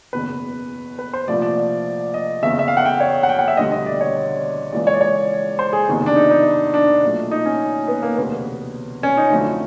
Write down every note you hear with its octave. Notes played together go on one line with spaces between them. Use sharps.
F#1 E2 B2 B4
B4
C5
C2 A#2 F3 A3 D5
D5
D#5
F#1 E2 C#3 E5
E5
F5
F#5
G5
C#5
F#5
G5
F#5
E5
E1 D2 D3 G3 D#5
D#5
D5
C#5
C#2 C#3 E3 G#3 D5
C#5
D5
C#5
C5
G#4
F#1 E2 C3 D#3
D4
D#4
D#4
D4
B1 A#2 F#3 A3
D#4
C#4
B3
A#3
E1 D2 C3 B3
C#4
D#4
F2 D3 F#3 A3